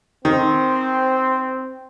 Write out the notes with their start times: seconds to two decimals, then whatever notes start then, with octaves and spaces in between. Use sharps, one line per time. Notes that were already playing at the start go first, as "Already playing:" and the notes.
0.25 D#3 C4